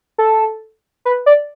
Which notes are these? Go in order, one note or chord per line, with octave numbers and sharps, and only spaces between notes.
A4
B4
D5